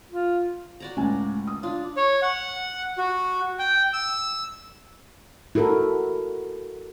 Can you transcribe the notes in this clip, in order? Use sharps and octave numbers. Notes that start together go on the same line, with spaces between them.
F4
F#4 D5 A#5
C#2 A2 C#4 G#5
D#6
D4 F4
C#5
F#5
F#4
G5
E6
E4 F#4 A4 A#4